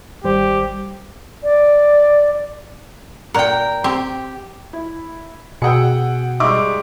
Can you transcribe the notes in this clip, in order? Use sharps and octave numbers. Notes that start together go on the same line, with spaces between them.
G#1 G3 G4 C5
D5
A#2 A#4 F#5 G5
C4 G4
E4
B2 G#4 F#5 G5 D#6 E6 C#7
G3 G#3 D#4 E5 C#6 D6